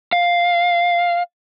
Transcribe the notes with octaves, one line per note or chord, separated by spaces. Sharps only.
F5